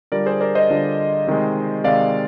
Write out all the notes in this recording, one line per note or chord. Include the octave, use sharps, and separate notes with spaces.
D3 G3 D4 F4 A#4 D5
G#4 C5
A#4 D5
C5 D#5
D3 G3 D4 F4
C3 D#3 G#3
C3 D#3 G#3 D5 F5